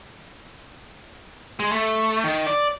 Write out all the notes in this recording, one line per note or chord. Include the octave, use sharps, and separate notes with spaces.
G#3
A3
D#3
D5